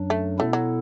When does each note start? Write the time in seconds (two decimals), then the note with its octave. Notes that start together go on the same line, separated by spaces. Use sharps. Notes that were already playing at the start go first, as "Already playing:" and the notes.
Already playing: F#2 F#3 D4
0.10 A3
0.39 B2 A3 B3 E4 A4
0.53 F#3